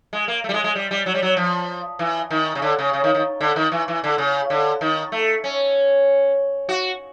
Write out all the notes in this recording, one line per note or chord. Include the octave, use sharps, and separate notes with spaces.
G#3
A#3
A3
G3
G#3
G#3
G3
G3
F#3
G3
F#3
F3
E3
D#3
C#3
D3
C#3
C#3
D#3
D#3
D3
D#3
E3
E3
D3
C#3
D3
D#3
A3
C#4
F#4